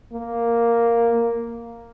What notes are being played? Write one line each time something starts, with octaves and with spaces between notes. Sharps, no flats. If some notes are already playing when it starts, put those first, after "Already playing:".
A#3